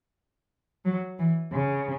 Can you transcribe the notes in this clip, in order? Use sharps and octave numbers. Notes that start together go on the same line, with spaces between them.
F#3
E3
C#3